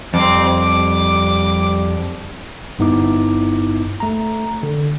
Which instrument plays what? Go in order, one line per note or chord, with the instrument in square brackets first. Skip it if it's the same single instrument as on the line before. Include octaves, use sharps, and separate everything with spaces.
[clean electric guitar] F2 [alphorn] G3 [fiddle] C4 D6
[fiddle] D6
[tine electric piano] G1 G2 B3 D#4 E4 D6
A3 A#5
D3